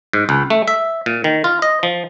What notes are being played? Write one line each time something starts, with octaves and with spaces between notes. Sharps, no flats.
G#2
C#2
A3
E5
A#2
D#3
F4
D#5
F3